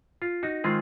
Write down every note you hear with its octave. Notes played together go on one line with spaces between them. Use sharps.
F4
D#4 F#4
D#3 G#3 C4 F4 G#4